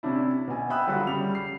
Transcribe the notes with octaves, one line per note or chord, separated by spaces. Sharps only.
C3 C#4 D4 E4
B2 G#5
E5 G5 B5 D#6 E6 F#6
D3 F#3 G3 F4 F#4 B5
C#3 G3 F7
C7